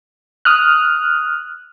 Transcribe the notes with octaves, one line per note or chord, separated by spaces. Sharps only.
D#6 F6 F#6